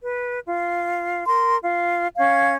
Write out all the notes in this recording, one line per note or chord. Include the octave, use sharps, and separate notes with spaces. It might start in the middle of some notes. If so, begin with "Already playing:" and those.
B4
F4
A#4 C6
F4
C#4 F5 G#6